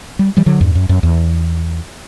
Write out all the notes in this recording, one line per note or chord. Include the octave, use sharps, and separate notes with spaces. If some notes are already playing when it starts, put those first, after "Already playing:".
G3
E3 G3
D3 F#3
E2 G2
F#2
F#2
E2